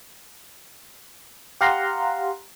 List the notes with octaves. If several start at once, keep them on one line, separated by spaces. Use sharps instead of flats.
G4 F5 F#5 A#5 C6